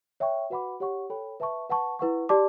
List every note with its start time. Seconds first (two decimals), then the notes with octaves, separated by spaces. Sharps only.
0.20 C#5 E5 G5 C#6
0.50 F#4 B4 F#5 B5 D6
0.80 G4 C#5 F#5 C#6
1.10 A4 C#5 G5 B5
1.40 B4 E5 A5 C#6
1.69 B4 F#5 A5 C#6
1.99 E4 B4 F#5 C#6
2.29 G4 D5 A5 D6